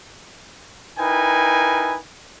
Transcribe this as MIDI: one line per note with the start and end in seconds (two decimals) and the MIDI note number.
0.98 1.99 63
0.98 1.99 64
0.98 1.99 70
0.98 1.99 71
0.98 1.99 79
0.98 1.99 80